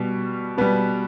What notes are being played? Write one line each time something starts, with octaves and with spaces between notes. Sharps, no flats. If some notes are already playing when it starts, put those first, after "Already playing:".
Already playing: B2 G3
B2 G3 B3